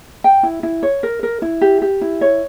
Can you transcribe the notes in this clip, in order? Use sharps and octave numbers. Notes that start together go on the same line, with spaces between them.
G5
E4
E4
C#5
A#4
A#4
E4
G4
G4
E4
C#5